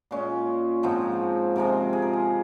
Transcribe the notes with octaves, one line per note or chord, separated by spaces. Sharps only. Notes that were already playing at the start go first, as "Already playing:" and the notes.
A#2 G#3 C#4
G#2 F3 C4 D#4
C3 F3 G#3 C4 A#4
G#4
A#4
G#4